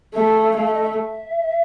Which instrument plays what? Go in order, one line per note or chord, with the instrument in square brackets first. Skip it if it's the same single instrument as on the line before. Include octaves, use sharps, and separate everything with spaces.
[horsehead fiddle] A3 [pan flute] E5
[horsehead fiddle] A3 [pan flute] F5
[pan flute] E5
D#5
E5